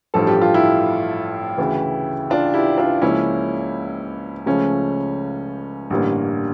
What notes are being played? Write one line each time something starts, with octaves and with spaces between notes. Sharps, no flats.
A1 G2 F3 A4
G4
F4
E4 G4
D2 C#3 E3
D4 F4
E4 G4
D4 F4
C#2 C#3 F3 A#3 C#4 E4
C#2 C#3 F3 A3 C#4
A1 G2 D3 G3 A#3